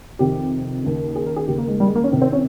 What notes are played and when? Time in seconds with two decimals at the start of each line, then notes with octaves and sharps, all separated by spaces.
0.19 F2 C3 D#3 G4
0.83 D#2 C#3
1.15 G#4
1.26 A#4
1.36 G#4
1.47 D#2 C#3 G4
1.58 A#3
1.68 G#3
1.80 G3
1.87 G#3
1.95 A#3
2.04 C#4
2.11 C2 C3 D#3 C4
2.22 C4
2.33 C#4